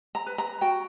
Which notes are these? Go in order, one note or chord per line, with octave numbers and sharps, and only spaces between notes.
A#5
B4
A#5
F#4 G5